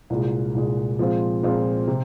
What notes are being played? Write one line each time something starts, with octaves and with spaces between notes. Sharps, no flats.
C2 A#2 G#3
C2 A#2 G#3
A#2 F3 G#3 C4 F4
A#2 F3 G#3 C4 F4
C3